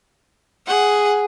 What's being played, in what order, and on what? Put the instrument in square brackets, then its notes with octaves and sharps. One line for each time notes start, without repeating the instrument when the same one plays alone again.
[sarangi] G#4 [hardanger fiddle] F#5